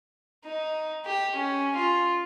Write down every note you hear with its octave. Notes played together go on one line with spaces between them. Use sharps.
D#4
G4
C#4
F4